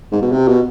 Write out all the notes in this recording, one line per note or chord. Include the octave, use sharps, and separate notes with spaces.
G#2
B2
C3
B2